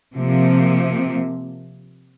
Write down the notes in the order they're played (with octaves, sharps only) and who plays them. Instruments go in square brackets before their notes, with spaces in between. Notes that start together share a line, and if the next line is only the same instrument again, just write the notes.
[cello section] C3 F3 A#3